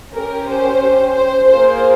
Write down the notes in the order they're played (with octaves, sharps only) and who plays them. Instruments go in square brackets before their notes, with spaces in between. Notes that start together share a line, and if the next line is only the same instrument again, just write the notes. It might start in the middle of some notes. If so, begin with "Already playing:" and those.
[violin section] C#4 G4 A#4
C5
C5
A#3 F4 G#4 C5